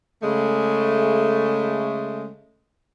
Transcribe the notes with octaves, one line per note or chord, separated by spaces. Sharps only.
C#3 G#3 A3